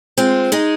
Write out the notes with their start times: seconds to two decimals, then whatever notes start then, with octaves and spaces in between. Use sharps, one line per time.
0.18 G#3 C4 F4
0.52 G#3 D#4 G#4